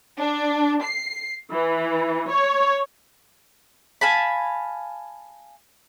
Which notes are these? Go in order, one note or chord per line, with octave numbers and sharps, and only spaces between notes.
D4
C7
E3
C#5
F5 G#5 A5 B5